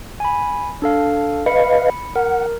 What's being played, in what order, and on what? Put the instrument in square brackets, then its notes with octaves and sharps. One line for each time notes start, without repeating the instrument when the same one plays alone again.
[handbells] G#5 B5
D4 A4 F5
[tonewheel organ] B4 D#5 F5 [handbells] B5 C#7
[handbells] A#4 [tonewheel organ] F#5